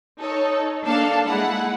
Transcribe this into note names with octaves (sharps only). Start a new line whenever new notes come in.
D#4 A4 C#5
A#3 D4 A4 F5 A5
G#3 E4 F#5